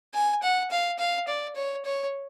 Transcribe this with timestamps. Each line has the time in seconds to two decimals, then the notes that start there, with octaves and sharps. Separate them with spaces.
0.14 G#5
0.43 F#5
0.71 F5
0.98 F5
1.28 D5
1.55 C#5
1.85 C#5